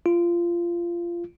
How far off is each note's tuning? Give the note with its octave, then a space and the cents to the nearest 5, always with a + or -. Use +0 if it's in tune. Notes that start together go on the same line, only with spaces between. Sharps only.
F4 -20